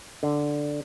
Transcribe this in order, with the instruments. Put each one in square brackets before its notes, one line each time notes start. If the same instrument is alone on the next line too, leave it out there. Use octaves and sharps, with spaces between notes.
[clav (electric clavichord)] D3